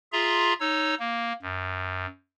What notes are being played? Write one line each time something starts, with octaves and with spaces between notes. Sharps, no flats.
F4 G#4 E5 A#5 C6
D#4 C#5 E6
A#3
F#2